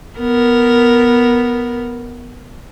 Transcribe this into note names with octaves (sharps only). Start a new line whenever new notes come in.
B3 A#4